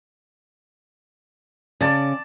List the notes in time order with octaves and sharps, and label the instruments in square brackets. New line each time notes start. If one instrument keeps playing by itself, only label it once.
[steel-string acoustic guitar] C#3 [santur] D5 A5 D6